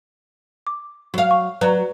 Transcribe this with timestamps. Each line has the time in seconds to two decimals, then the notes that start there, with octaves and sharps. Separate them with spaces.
0.67 D6
1.14 F#3 F5
1.31 C#6
1.61 F#3 B4 D5 A#5